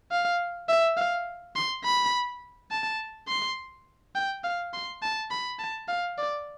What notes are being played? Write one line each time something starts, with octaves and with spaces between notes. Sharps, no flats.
F5
E5
F5
C6
B5
A5
C6
G5
F5
C6
A5
B5
A5
F5
D5